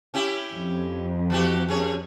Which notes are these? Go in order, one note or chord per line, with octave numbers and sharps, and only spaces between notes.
C#4 E4 G4
F2
E3 F#4 G4
F#2 G#4 C#5